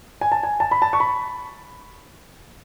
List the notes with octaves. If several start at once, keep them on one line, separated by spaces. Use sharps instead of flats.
G#5
A5
G#5
A5
B5
A5
C#6
B5